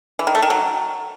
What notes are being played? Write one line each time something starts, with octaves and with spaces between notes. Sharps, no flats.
E3
D#3
A3
D#3
F#3